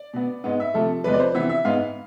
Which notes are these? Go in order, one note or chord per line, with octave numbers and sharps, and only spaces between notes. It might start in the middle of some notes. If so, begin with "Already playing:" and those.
Already playing: D5
B2 B3
G#2 G#3 B3
E5
C3 F3 A3 A4
E2 C3 F3 G#3 B4
D5
C5
C3 E3 B3 E5
E5
G#2 G#3 B3 F5